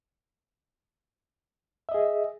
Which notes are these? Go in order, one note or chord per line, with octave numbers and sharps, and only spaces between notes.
G#4 D#5 E5